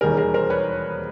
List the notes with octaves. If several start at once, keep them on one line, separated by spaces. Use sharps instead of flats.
E1 D#2 D#3 G3 G#4 A#4
G#4 A#4
A#4 C5
B4 C#5